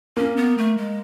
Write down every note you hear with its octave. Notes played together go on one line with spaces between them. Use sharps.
A#3 C#4
B3
A3
G#3